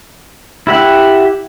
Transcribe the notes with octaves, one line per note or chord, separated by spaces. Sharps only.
E4 G4 F#5